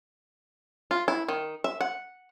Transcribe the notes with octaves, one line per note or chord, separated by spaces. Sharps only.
F4
E4
D#3
E5
F#5